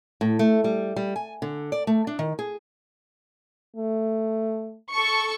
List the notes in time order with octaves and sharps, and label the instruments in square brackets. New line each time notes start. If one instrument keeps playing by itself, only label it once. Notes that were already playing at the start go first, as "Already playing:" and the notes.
[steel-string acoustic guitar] A2
A3
G3
G3
G#5
D3
D5
A3
D4
D#3
G#4
[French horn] A3
[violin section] A4 C#6